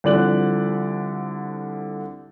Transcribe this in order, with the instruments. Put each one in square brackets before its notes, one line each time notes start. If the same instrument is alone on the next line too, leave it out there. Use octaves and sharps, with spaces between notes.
[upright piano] C2 D3 F3 D5 F#6 F#7